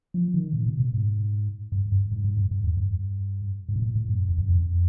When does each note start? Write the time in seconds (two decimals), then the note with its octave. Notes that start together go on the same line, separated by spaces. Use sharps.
0.14 F3
0.34 D#3
0.53 A#2
0.66 B2
0.80 B2
0.93 G#2
1.72 G2
1.92 G2
2.12 G#2
2.24 G#2
2.37 G2
2.51 G2
2.64 E2
2.77 G2
3.69 G#2
3.76 A#2
3.82 A2
3.96 A2
4.08 F#2
4.29 F2
4.38 F#2
4.48 F2